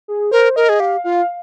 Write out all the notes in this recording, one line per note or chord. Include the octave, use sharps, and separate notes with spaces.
G#4
A#4 C5
A#4 D#5
G#4
G4 F5
F4 F5